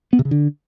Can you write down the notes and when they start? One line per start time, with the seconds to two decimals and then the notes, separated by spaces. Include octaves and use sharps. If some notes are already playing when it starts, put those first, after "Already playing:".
0.13 B3
0.19 C3
0.25 C#3
0.31 D3